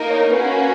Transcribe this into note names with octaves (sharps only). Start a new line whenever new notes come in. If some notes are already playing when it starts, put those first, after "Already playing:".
Already playing: A#3 D#4 A#4
C#5
A#3 C#4 F#4 B4